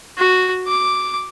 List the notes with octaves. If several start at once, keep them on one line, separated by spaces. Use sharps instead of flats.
F#4
D6